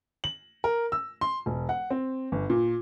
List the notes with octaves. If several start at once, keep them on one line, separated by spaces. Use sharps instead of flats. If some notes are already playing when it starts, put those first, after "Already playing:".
F#7
A#4
E6
C6
E1
F#5
C4
G1
A#2